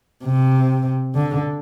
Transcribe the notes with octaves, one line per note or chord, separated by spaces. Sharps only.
C3
D3